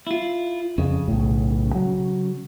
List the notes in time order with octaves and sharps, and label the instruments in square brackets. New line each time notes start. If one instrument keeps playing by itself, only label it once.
[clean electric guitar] E4 F4
[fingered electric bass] F2 [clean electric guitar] C#3
[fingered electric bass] B1 A2
F#3